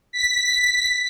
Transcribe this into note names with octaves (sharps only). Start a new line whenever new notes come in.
B6